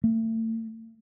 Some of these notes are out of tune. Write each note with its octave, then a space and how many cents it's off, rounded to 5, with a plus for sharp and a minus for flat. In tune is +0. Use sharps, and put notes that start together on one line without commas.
A3 +40